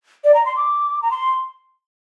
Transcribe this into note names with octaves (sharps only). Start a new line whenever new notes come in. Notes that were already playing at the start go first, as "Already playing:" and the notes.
D5
A#5
C6
D6
A#5
C6